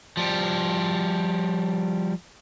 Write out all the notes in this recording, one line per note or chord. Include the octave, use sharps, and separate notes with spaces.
F3 G3